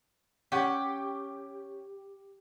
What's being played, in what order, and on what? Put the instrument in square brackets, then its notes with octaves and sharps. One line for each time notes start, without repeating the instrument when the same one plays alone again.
[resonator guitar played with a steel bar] C#4 F#5 [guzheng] G4